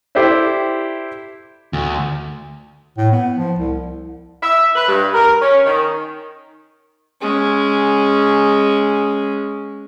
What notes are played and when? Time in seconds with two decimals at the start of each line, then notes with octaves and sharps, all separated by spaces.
0.15 E4 G4 A4 C5 D5 E5
1.73 D2
2.97 A2
3.12 B3
3.37 F3
3.59 C2
4.42 E5
4.74 B4
4.86 G2
5.13 A#4
5.40 C#4
5.64 D#3
7.21 G#3 C#4